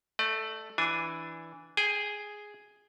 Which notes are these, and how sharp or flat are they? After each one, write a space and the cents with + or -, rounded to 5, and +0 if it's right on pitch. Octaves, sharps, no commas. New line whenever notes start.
A3 +0 D5 +45
E3 +0 D4 +0 G#5 +0
G#4 +0 G5 +40